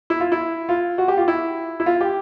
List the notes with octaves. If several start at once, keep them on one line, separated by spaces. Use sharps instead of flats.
E4
F4
E4
F4
F#4
G4
F4
E4
E4
F4
G4